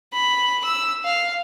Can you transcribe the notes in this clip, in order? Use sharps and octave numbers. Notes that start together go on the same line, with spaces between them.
B5
E6
F5